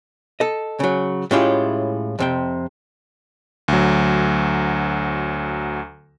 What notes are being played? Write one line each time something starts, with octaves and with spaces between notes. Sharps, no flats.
A4 D#5
C#3 F#3
A2 G#3 C#4 E4 F4 G4
F2 C3 G5
D2 F#3